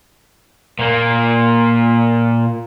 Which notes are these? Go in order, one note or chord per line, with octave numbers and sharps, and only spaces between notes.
A#2 A#3